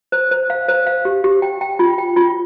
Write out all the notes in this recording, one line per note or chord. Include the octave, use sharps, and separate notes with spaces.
C5
C5
F5
C5
F5
G4
G4
G5
G5
F4
G5
F4